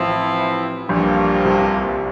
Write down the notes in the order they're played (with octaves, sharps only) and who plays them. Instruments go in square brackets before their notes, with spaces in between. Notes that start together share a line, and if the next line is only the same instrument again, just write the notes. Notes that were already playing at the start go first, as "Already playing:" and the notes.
Already playing: [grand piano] A1 A2 [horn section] F3 C4 E4
[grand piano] A#1 A#2 [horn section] G2 F3 A#3
[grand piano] C2 C3